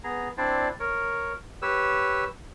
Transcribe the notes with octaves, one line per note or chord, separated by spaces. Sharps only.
B3 G#4 A#5
C4 D4 E4 C5 D5
A#4 C#5
G4 B4 C#5 E6